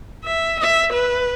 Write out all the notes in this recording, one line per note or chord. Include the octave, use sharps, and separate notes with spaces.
E5
E5
B4